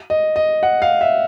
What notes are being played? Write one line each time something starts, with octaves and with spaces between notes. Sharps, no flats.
D#5
D#5
F#5
F5
E5